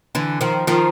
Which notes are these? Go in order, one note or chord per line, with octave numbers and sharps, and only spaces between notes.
D3 E3
D#3 F3
D#3 F3